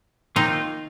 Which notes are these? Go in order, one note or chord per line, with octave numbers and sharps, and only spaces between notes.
D#3 A#3 C4 D#4 F4